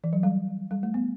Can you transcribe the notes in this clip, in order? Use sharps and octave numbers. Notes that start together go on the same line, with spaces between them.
E3
F#3
G3
G3
A3
B3